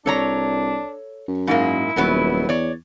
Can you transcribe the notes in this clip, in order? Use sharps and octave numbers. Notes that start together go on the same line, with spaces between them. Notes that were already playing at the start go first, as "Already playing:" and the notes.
C2 D4 A4 C#5 A#5
F#2
G#2 G#3 A#3 E4
D#1 F#2 F#3 B3
E2 C#5 D5